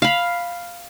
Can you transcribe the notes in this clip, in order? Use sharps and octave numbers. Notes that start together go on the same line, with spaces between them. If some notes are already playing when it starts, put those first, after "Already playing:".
F5 B5